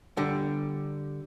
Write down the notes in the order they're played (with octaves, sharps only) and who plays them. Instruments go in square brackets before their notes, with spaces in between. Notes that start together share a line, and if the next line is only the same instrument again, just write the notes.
[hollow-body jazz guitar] D3 G3